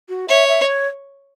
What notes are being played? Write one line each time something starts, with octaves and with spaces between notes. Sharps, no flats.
F#4
C#5 E5
E5
D#5
C#5